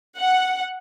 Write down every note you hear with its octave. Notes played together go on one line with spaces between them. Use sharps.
F#5